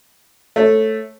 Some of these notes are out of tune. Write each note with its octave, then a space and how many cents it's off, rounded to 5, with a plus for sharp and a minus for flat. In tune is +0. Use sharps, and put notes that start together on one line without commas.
A3 +0 C#5 -15